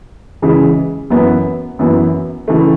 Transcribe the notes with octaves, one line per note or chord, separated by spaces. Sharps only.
C#3 E3 G#3
F#2 E3 B3
F#2 E3 B3
C#3 E3 A3